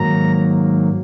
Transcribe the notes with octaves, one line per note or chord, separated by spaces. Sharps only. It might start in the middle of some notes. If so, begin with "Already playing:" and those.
Already playing: G#2 D#3 F#3 A#3 A#5